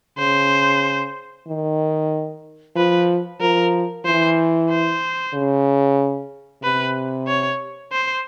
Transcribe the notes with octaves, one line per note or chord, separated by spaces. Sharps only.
C#3 C5
D#3
F3 B4
F3 A#4
E3 C5
C5
C#3
C3 B4
C#5
C5